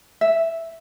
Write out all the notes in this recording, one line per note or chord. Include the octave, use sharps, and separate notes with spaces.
E5